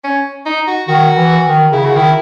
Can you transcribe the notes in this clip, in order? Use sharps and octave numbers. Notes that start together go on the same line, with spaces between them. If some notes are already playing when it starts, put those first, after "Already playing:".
C#4
D#4
F#4
D#3 F#4
E3
D#3
C#3 E4
F#4
D#3 E4